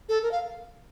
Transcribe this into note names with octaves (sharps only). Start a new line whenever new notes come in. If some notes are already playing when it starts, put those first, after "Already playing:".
A4
A#4
F5